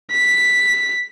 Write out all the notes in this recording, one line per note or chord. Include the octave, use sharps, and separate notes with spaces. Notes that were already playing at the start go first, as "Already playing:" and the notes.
B6